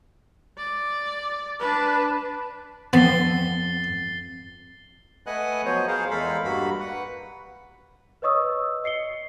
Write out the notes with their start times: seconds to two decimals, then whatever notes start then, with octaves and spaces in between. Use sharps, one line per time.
0.58 D5
1.59 D4 B4
2.93 F2 B3 A6 C7 G7
5.27 A3 B4 D#5 F#5 G#5 F#6
5.65 F3 F#3 B3 C5 C#5
5.88 G#4 A#4 C5 F5
6.11 E2 G#3 A4 A#4 F5 B5
6.45 G2 A#3 F#4 B5
6.80 B4 F#5
8.22 B4 C#5 D#5 C#6 D#6 E6
8.84 D#5 C7 C#7 G7